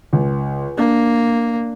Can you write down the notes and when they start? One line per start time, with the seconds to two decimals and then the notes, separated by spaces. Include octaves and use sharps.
0.13 C#2
0.78 A#3 D4